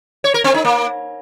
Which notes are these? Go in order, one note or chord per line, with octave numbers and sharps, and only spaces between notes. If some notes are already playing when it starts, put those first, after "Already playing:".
C#5
A#4
C4
D#4
A#3